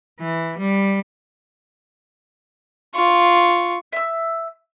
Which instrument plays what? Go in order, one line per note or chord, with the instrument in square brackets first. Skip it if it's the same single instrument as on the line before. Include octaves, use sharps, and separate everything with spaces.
[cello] E3
G3
[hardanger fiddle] F4 C#6
[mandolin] E5 E6